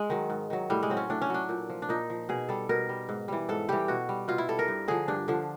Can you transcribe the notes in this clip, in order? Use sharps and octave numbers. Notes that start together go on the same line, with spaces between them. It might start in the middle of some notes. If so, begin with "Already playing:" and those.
Already playing: G#3
D#3 F#3
G#2
D#3 F#3
A2 G3
G#3
F#3 C4
C#4
A2 D4
C#4
F#3 D4
A#2
F3
D4
A#2 D#4
F3
B2 G#4
G3 A4
B2 A#4
G3
G#2
E3 G3
G#2 A4
E3 G3 G4
B2 F#4
G3
B2 F4
E4
G3 A4
A#4
G2
D3 F3 G#4
G2 D4
D3 F3